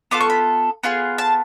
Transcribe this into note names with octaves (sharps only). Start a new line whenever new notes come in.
B3 F4 A4 D6
C#6
B5
B3 F4 G#4
A5